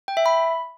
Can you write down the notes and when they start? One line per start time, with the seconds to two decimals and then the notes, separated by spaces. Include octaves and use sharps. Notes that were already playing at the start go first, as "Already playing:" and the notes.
0.08 G5
0.17 E5
0.26 B5